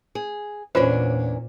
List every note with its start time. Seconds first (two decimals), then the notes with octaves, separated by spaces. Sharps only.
0.15 G#4
0.75 E2 A#2 C#4 D4 F4 B4 C5